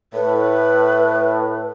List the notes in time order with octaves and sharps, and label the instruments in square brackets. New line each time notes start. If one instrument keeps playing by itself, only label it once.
[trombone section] A2 [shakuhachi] B4